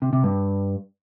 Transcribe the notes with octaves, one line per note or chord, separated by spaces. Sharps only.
C3
C3
G2